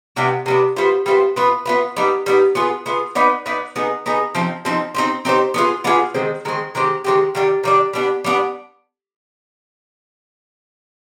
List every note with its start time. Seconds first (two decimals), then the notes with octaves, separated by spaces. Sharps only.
0.16 C3 G3 B3 D4
0.46 C3 G3 B3 D4
0.76 G3 B3 F4 C5
1.06 G3 B3 F4 C5
1.36 B3 F4 B4
1.66 B3 F4 B4
1.96 G3 B3 D#4
2.26 G3 B3 D#4
2.55 B3 F4 G#4
2.86 B3 F4 G#4
3.15 B3 D#4 B4 D5
3.46 B3 D#4 B4 D5
3.76 B3 D#4 G#4
4.06 B3 D#4 G#4
4.35 F3 C4 D#4
4.65 F3 C4 D#4
4.95 C4 D#4 G4 C5
5.25 C4 D#4 G4 C5
5.54 B3 D4 F4 G#4
5.84 B3 D4 F4 G#4
6.14 D#3 G#3 C4
6.45 D#3 G#3 C4
6.75 D#3 G#3 C4 G4
7.04 D#3 G#3 C4 G4
7.35 D#3 G3 D4
7.64 D#3 G3 D4
7.93 G3 B3 D4
8.24 G3 B3 D4